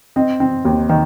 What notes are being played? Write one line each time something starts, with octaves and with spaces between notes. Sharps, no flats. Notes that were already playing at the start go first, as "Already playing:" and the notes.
C4 D#5
C4
D#2
D#3